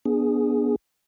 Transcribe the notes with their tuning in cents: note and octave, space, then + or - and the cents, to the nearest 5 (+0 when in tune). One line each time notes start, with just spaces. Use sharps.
B3 -20 D4 +0 G#4 +0